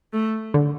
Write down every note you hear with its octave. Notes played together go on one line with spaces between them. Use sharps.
A3
D3